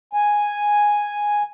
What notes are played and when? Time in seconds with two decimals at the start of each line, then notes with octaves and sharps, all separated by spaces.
0.13 G#5